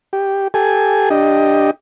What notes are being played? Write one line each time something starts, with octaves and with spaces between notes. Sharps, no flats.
G4
G4 A4 G#5
D4 G4 D#5